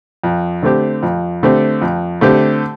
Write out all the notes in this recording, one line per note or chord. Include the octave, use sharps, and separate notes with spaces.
F2
D3 A3 C4 G4
F2
D3 A3 C4 G4
F2
D3 A3 C4 G4